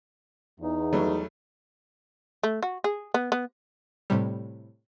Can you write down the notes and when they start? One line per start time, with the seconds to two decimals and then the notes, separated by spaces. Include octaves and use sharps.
0.60 E2 D#4
0.93 F#3 G3 A3
2.43 A3
2.63 F#4
2.84 G#4
3.14 B3
3.32 B3
4.10 A2 C3 G3